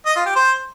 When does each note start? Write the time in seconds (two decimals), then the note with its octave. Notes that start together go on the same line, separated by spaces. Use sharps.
0.06 D#5
0.16 F4
0.26 G4
0.35 C5